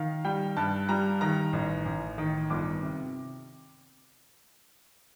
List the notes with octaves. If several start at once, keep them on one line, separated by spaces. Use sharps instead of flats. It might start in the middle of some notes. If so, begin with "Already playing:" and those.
Already playing: D#3 F5
G3 G5
G2 A5
G3 A#5
D#3 A#5
A1
A1
D#3
G1 D6
C3